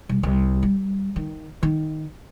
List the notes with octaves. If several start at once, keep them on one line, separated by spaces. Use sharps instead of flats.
C2
C2
G3
D#3
D#3